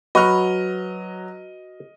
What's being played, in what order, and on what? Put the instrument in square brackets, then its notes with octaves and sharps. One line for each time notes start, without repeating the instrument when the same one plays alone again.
[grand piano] F#3 [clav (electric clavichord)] F#4 B4 F#5 [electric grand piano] D#5 F6